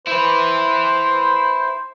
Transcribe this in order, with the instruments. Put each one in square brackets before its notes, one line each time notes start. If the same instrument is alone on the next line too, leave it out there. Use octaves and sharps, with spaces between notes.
[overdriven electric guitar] E4 B4 [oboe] C5